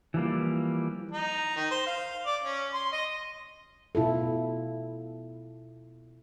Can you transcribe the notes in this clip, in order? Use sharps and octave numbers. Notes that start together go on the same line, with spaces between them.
E3 F3 G3 A#3
D#4
D#3
C5
F5
D5
C#4
C6
D#5
B2 E4 F4 A4